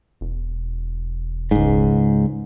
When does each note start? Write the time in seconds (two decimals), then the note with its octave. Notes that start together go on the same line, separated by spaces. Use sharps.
0.21 E1
1.51 C#2 G#2